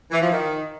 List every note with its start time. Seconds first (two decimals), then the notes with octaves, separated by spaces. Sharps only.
0.11 E3
0.22 F3
0.32 D#3